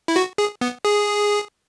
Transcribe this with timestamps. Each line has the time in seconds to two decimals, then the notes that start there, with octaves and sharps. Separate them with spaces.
0.08 E4
0.16 F#4
0.38 G#4
0.61 B3
0.85 G#4